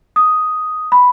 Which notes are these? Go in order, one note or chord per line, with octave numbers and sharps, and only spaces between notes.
D#6
B5